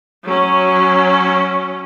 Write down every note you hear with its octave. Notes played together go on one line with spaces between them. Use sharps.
F#3 C#4